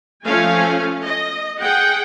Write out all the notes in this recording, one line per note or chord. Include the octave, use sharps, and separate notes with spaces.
F3 A3 C#4 F5 G#5
D#5
G#4 F#5 G5